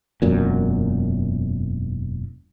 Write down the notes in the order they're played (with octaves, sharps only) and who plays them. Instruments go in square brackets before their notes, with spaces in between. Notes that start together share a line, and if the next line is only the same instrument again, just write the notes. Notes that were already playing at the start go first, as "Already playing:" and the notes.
[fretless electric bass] E1 F#2 A#2